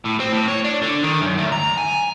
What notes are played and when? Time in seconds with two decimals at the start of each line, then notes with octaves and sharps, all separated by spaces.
0.05 A2
0.20 C4
0.32 A2
0.48 C#5
0.65 D4
0.82 D3
1.03 D#3
1.21 F#2
1.38 D2
1.52 A#5
1.78 G#5